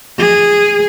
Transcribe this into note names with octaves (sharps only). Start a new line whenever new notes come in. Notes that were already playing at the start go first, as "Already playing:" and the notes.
G#4